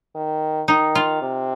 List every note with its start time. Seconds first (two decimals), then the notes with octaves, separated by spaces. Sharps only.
0.15 D#3
0.68 D#3 D#4
0.95 F4
1.22 C3